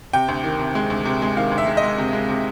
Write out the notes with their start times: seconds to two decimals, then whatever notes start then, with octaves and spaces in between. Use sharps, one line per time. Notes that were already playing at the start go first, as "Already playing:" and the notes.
0.13 C3 G5
0.28 D2
0.44 D#3
0.59 C3
0.75 G#3
0.90 D2
1.05 C3
1.22 G#3
1.37 D#3 F5
1.51 D2
1.58 E5
1.67 G#3
1.77 D#5
1.83 G#3
1.98 C3
2.13 G#3
2.29 C3